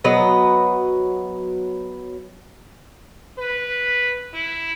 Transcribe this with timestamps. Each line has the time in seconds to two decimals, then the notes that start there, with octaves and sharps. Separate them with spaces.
0.04 F#3 B3 B4 D#5
3.38 B4
4.34 E4